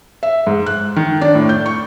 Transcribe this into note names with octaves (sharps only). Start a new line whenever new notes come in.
E5
G#2
F#6
D#3
D4
A2
G6
C#6